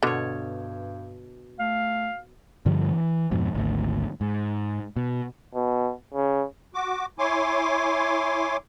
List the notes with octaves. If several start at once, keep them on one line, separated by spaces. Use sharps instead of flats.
G2 B2 D3 C#5
A3 F5
G2 D3 F3 G3
E3
F2 G#2 B2
G#1 D2
G#2
B2
B2
C#3
F#4 D6
E4 C#5 G#5 C6 D6